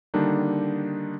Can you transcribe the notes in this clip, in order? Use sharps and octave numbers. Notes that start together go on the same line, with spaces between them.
D3 D#3 G3 A#3 D4 D#4